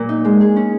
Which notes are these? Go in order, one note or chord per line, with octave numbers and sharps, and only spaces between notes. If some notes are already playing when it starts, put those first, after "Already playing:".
Already playing: A#2 F#3 A#3
D#4
G#3
G#4
C#4